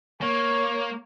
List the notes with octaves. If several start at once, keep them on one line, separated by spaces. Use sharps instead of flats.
A#3 C#5